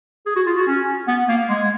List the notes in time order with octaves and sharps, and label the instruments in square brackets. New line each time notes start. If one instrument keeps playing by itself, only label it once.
[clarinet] G#4
F#4
F4
F#4
C#4
B3
A#3
G#3